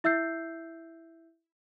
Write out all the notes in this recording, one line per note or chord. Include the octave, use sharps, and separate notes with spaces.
E4 E5 E6 G6 C7